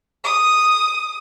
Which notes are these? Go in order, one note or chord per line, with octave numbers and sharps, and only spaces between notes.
D#6